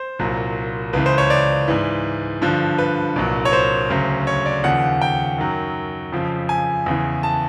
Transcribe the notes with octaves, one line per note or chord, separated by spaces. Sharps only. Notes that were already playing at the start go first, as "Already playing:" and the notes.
Already playing: C5
C2 A#2 F#3
C#2 C#3 E3 B4
C5
C#5
D5
G#2 E3
G2 D3 F3
B4
C2 A#2 F#3
C#5
C5
D2 C#3 F#3
C#5
D5
D#2 C#3 F3 F#5
G5
F#2 D#3 F#3
F2 C#3 F3
G#5
E2 C#3 E3
A5